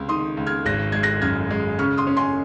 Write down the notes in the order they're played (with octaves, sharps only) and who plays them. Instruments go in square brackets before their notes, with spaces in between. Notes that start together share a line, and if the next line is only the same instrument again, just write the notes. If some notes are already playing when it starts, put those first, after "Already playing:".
Already playing: [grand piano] C#2 C3
[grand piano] D#3 [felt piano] C6 D#6
[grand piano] C#2
[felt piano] F6 G#6
[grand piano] G#1 [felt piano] F#6 A#6
[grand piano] G#3 [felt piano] G#6
[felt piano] F#6 A#6
[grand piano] F#2 [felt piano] F6 G#6
[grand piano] G#3
[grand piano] C#3 [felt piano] C#6 F6
[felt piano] C6 D#6
[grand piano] C#4
[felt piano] G#5 C6